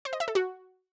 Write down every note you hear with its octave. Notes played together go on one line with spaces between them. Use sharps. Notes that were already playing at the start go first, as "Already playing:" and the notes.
C5
D#5
E5
A4
F#4